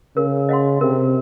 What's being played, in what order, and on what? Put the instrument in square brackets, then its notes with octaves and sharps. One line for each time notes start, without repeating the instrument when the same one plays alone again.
[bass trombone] C#3 [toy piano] A#4
[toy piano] D#5 F#5 C6
[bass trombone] C3 [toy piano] A#4